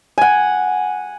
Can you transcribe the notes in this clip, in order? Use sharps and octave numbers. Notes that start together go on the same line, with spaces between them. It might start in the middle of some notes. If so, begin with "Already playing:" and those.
F#5 G#5